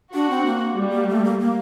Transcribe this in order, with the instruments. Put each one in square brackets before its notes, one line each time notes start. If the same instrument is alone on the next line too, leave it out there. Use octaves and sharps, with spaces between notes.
[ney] D4 [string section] F#4
[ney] C4
A#3
[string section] G3
[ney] A#3
A3
A#3
A#3